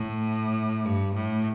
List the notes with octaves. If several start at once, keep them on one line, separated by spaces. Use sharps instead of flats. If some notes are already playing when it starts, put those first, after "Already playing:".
Already playing: A2
G2
A2